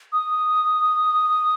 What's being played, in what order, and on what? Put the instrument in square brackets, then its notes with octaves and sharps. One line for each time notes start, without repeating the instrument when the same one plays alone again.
[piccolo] D#6